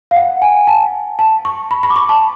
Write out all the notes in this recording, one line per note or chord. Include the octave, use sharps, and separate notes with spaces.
F5
F#5
G#5
A5
A5
C#6
B5
B5
D6
C#6
A5